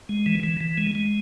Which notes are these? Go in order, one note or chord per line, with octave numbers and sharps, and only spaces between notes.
G#3
E3
E3
E3
G#3
G#3